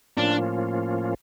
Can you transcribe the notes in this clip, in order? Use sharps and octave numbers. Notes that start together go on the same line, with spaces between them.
A2 F3 A#3 C#4 D4 F4